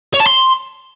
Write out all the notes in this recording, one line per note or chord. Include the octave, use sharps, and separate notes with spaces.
C#5
A5
C6